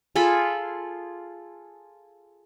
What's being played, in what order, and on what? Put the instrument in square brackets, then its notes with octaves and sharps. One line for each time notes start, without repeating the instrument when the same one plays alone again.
[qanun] F4 G#4 A4 B5